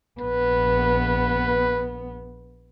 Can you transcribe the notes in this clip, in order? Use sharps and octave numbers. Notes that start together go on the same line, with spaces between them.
A#1 B3 B4